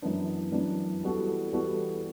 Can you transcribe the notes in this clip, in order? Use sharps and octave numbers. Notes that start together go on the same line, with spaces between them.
F#2 E3 B3 D4
F#2 E3 B3 D4
E3 G3 B3 F#4 A4
E3 G3 B3 F#4 A4